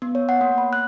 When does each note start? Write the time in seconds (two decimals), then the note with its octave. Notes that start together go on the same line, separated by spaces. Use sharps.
0.02 B3
0.15 C#5
0.29 F#5
0.41 A#3
0.58 B5
0.73 F#6